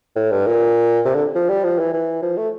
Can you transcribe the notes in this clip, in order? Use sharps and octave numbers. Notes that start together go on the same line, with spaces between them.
A2
G2
A#2
C3
D3
F3
G3
F3
E3
E3
F3
A3